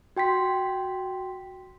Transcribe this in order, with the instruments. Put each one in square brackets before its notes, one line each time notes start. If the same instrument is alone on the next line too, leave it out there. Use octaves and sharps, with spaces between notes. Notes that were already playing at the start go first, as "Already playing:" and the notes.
[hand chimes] F#4 G5 C6 B6